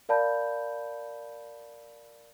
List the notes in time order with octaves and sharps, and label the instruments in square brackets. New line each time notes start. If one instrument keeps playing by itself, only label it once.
[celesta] A#4 D5 F5 A5 B5 G6